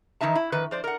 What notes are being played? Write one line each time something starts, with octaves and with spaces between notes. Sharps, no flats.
D#3 E3 D#4 E5 A5
E4
F2 D#3 B4
F3 C5 D5
A#4 F#5